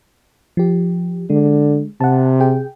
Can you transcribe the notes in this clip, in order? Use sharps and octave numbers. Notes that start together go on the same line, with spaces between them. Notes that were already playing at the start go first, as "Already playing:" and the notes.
F3 G4
D3 G#3
C3 F#5 A5
G#4 G5